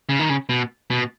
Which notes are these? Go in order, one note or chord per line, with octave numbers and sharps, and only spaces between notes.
C#3
D#3
C#3
B2
B2